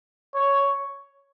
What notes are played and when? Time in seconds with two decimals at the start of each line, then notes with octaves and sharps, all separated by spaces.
0.35 C#5